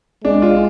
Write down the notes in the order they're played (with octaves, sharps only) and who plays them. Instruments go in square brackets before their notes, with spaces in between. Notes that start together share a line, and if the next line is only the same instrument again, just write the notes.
[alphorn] G#3 [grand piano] D4
[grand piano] F4